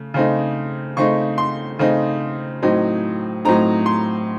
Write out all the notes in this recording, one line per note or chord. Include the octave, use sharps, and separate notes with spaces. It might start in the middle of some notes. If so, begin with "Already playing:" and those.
Already playing: C#3 A3
C#3 A3 C4 D#4
C#3 A3 C4 D#4 C#6
C6
C#3 A3 C4 D#4
A2 F#3 C4 D#4
A2 F#3 C4 D#4 A#5
C6